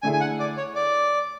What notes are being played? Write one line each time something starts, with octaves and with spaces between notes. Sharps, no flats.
D3 A3 E4 G#4 G#5
G#5
F#5
D5
C#5
D5